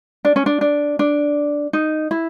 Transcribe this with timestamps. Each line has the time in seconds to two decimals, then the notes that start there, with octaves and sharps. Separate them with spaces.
0.25 D4
0.36 C#4
0.46 D4
0.61 D4
0.99 D4
1.73 D#4
2.11 E4